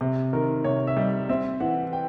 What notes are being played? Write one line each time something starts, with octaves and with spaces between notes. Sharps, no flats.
C3
D#3 A#4
C3 C#5
E5
G3 D#5
C4 E5
E3 F#5
G5